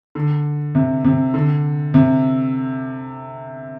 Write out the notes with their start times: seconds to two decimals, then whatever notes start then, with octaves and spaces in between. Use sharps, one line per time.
0.15 D3
0.75 C3
1.04 C3
1.34 D3
1.94 C3